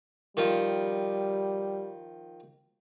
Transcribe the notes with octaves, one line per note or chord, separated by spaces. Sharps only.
D#3 F3 G3